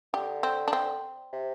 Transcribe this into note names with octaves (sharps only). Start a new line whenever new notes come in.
D3 G4
C4
D4
C4
C3